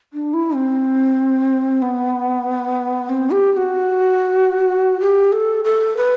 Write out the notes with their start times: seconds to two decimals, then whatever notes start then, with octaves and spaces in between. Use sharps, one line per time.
0.13 D4
0.33 E4
0.55 C4
1.82 B3
3.09 C4
3.31 G4
3.52 G4
3.57 F#4
5.00 G4
5.32 A4
5.64 A4
5.97 B4